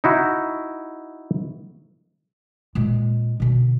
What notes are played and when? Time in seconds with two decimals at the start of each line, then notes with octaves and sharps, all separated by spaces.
0.04 D#4 E4 F#4
2.75 A#2 G#3
3.40 B2 D3